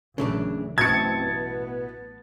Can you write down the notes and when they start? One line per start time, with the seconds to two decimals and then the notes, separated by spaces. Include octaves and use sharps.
0.18 A#1 F#2 C#3 E3 A3 D4
0.78 A1 F#2 B2 C4 E4 A5 G#6 C#7
1.23 B3